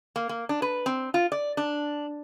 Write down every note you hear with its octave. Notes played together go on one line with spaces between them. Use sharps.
A#3
A#3
D4
B4
C4
F4
D5
D4